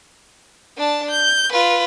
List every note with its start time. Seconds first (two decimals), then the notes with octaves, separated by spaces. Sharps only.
0.78 D4 A5
1.11 G6
1.52 F4 B4